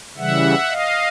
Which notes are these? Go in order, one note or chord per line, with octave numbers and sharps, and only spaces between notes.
C#3 E3 G3 E5 F#5
D#5 F5